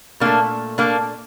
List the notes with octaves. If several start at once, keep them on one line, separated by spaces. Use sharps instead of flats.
A#2 A3 A#3 D4
A#3 D4